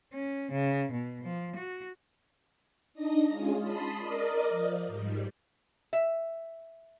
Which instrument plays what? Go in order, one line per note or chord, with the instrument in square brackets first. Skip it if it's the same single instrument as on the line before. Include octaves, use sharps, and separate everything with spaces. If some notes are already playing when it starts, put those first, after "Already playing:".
[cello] C#4
C#3
B2
F3
F#4
[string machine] D4 D#4 D#5 A#6
G#3 C#4 F4 G#4
A5 B5 C6 D#6
A#4 D5 D#5
F3
G#2 G3
[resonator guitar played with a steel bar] E5